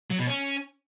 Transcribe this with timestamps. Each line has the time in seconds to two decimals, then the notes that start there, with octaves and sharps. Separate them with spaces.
0.10 F#3
0.19 B2
0.27 C#4